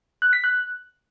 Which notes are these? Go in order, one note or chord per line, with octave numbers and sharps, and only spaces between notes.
F#6
B6
F#6